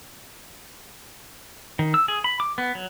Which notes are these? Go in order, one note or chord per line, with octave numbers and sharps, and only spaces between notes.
D#3
E6
G#4
B5
D6
B3
F#3